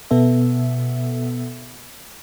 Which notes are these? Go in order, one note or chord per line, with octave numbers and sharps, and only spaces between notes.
B2 B3 A4 E5